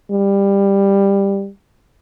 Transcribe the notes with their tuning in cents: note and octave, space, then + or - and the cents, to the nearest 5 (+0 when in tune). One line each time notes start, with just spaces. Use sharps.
G3 +15